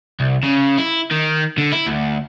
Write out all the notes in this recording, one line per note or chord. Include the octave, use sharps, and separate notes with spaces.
C2
C#3
E4
D#3
D3
E4
D2